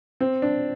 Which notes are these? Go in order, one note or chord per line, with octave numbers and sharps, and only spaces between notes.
C4
D4